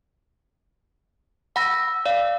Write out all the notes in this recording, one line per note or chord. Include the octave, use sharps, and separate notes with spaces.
F#5 B5 E6 A#6
D5 F5